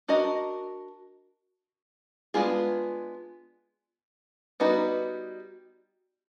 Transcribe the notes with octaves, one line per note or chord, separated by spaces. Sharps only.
D4 F#4 A#4 D#5
G#3 B3 D4 F4 G#4
G3 B3 D#4 F#4 B4